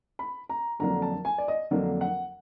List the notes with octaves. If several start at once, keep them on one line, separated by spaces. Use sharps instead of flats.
B5
A#5
F2 D3 F#3 A#3 D4 A#5
A5
G#5
D5
D#5
F2 D3 F#3 A#3 D4
F#5